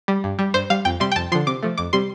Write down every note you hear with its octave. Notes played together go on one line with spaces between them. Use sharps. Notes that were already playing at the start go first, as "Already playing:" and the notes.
G3
G2
G3
G2 C5
G3 F5
F2 G5
C3 G3 C6
G5
F2 A5
D3 F3 C6
C3 D6
F3 A3
F2 D6
C3 G3 C6